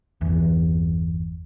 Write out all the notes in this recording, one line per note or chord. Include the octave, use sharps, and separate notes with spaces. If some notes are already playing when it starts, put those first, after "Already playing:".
G1 E2 E3